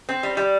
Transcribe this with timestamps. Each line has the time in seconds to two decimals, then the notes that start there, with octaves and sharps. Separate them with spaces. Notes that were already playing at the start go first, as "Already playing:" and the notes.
0.09 C4
0.23 G3
0.37 G3